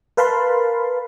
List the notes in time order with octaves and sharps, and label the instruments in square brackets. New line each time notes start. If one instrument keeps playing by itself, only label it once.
[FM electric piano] A#4 B4 F5 A5 B5 C6